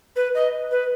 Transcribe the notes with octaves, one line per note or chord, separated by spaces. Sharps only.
B4
D#5
B4